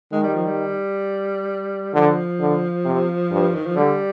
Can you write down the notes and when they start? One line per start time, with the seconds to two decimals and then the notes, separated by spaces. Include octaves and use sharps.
0.12 D#3 G#3
0.23 G3
0.34 F3
0.45 G3
1.94 D3 F3
2.40 D3
2.85 C3
3.31 G2
3.55 D#3
3.66 F3
3.76 D3 G3